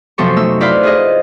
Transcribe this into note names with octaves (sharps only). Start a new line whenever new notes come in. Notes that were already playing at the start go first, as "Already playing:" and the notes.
F#2 C3 F3 A4 C5 C#6
A3 D#4 E6
E4 B4 C5 D5 F5 B5
F4 G#4 D#5